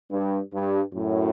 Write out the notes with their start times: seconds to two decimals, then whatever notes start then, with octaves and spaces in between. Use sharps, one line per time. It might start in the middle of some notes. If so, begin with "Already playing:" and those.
0.11 G2
0.53 G2
0.93 F#2 A2